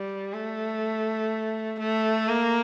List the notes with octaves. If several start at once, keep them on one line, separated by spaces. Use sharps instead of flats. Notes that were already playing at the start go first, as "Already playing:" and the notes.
Already playing: G3
A3
A3
A#3